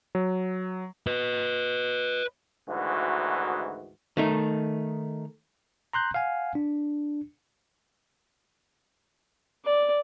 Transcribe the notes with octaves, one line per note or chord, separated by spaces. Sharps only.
F#3
B4 D#5
D2 G#2 D#3 E3 F#4
D#3 A3 D#4
A#5 C6 F#6 G6
F5 F#5 G#5
D4
D5